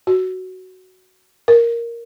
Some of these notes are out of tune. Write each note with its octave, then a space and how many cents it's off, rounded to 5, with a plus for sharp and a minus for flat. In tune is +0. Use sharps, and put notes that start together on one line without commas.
F#4 +10
A#4 +0